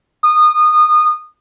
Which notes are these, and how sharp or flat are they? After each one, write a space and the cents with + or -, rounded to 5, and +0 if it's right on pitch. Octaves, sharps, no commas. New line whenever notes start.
D#6 -25